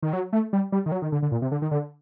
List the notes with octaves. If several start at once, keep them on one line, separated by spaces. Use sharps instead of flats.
D#3
F#3
A3
G3
G3
D#3
F#3
D#3
D3
D3
A#2
C3
D3
D#3
D3